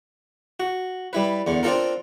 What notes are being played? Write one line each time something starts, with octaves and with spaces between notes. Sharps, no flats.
F#4
G3 E4 B4
E2 D3
C4 D4 F4 A4 A#4